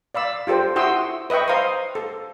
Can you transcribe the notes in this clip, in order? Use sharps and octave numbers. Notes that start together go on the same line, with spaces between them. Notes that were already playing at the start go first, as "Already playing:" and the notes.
D5 F5 B5 E6
F4 G4 A4 C5 G5
E4 F#4 G5 C6 D#6 E6
B4 D#5 E5 G5 C#6
C5 F5 A#5 C6 D#6
A4